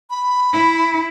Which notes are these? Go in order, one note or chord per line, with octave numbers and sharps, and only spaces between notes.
B5
E4